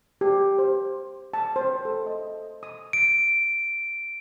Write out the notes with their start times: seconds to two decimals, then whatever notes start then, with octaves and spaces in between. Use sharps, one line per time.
0.21 G4
0.59 C5
1.34 A5
1.56 C5
1.85 A4
2.07 D#5
2.63 D#6
2.93 D7